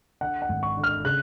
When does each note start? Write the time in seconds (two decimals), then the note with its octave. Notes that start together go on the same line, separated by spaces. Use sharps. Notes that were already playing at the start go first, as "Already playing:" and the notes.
0.21 D3 F#5
0.42 F#5
0.49 G#1
0.63 C#6
0.77 D3
0.83 F6
1.04 C#3 F#6